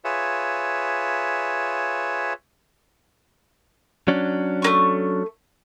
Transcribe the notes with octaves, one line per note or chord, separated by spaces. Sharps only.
F4 G#4 B4 C#5 E5
F#3 C#4 D4
A3 A#3 C#6